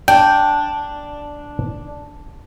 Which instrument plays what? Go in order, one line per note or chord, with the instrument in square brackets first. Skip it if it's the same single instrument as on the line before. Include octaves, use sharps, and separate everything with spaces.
[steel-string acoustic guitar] D4 [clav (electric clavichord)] G5